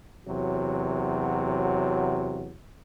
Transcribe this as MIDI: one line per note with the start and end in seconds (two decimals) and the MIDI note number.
0.27 2.53 40
0.27 2.53 48
0.27 2.53 54